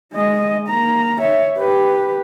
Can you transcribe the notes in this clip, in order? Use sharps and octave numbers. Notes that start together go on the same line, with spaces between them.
G#3 D#5
A#3 A#5
C#5 E5
G4 B4